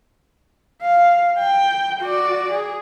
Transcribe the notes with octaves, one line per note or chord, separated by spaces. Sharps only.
F5
G5
F#4 D5
G#4